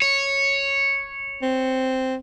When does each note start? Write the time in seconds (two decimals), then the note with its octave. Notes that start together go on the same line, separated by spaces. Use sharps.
0.02 C#5
1.42 C4